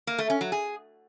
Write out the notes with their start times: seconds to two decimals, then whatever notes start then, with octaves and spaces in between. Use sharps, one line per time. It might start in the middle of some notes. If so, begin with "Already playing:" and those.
0.07 A#3
0.18 A3
0.30 C#4
0.41 F#3
0.52 G#4